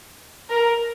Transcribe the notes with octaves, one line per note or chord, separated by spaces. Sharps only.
A#4